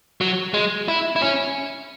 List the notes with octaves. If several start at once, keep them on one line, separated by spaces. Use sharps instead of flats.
F#3
G#3
E4
E4
C#4